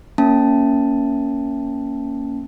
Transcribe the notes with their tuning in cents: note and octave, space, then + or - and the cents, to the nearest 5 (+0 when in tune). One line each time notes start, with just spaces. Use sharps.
A#3 +0 C#4 +5 A5 +0